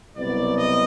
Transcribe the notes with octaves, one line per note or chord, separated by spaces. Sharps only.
C2 B2 F#3 B3 D5
D#5